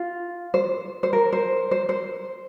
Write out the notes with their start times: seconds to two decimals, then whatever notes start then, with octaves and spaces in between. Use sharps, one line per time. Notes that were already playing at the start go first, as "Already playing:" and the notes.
Already playing: F4
0.54 C5
1.03 C5
1.13 A#4
1.33 C5
1.71 C5
1.89 C5